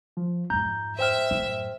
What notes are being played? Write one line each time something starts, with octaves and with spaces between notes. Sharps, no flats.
F3
F2 G#2 A#5 G6
C5 E5 G5 F6
F#2 A2